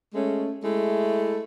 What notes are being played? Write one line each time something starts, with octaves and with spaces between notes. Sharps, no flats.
G#3 A3 C#4
G#3 A3 E4